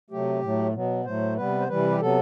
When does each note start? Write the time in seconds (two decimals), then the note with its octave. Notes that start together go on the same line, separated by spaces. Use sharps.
0.10 C3 F#3 A3 G4
0.43 A2 F#3 A3
0.73 B2 F#3 B3
1.05 A2 F#3 A3 C5
1.37 C3 G3 B3 B4
1.60 C5
1.68 C3 E3 G3 B4
1.90 G4
2.00 C3 F#3 B3 A4